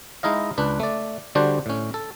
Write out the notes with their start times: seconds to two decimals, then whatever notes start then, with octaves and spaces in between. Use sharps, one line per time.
0.23 G#3 D#4 E4 D#5 F5
0.58 C#2 D4 B4
0.80 A3 D5
1.35 D3 G3 D4 F#4 C5
1.66 A2 C#4
1.94 A4